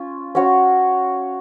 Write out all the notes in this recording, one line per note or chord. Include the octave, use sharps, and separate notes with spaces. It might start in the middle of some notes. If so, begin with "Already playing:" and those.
Already playing: C#4 F4
C#4 F#4 C#5